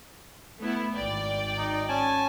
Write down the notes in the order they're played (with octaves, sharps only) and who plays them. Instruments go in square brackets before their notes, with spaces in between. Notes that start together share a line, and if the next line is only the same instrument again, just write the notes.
[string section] A3 B3 E4
G#1 D5 G5
[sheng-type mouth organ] D#4
C#4 G#5 A5